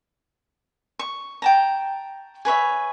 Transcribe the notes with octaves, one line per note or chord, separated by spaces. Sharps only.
C#6
G5 A5 A#5
G#4 B4 C#5 E5